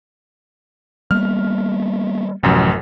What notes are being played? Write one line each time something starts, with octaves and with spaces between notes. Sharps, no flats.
G3 A#3 B3 F6
A1 F#2 C3 E3 F3